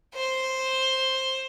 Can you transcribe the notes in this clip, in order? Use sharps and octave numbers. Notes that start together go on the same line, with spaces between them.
C5